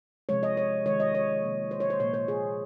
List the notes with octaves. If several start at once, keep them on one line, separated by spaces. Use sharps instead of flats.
C3 F3 G#3 C#5
D#5
C#5
D#3 G#3 C#5
D#5
C#5
C3 F3 A#3
C5
C#5
C5
A#2 F3 A#3 C#5
C5
G#4